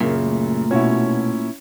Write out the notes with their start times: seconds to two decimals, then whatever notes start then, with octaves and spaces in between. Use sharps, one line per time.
0.01 F#2 A#2 C#3 A#4
0.24 A3
0.71 B2 C#4 E4 F#4 C#5